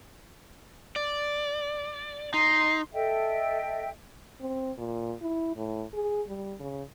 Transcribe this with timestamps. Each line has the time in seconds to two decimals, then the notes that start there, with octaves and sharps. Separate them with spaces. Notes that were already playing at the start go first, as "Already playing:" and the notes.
0.96 D5
2.34 D#4 C6
2.92 A4 D#5 E5 G5
4.41 C4
4.78 A#2
5.21 E4
5.56 A2
5.94 G#4
6.27 G3
6.60 C#3